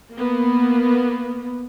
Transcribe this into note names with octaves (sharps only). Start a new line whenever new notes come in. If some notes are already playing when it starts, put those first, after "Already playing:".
A#3 B3